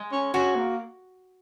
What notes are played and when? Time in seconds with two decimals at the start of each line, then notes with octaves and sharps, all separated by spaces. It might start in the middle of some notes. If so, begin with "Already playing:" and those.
Already playing: G#3
0.12 C#4
0.34 C#4 F#4
0.56 A#3